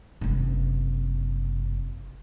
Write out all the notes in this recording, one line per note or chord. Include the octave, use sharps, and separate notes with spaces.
F#1 C3